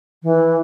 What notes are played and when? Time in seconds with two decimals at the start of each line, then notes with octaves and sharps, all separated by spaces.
0.23 E3